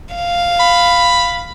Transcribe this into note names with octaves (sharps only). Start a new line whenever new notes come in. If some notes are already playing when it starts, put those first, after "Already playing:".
F5
B5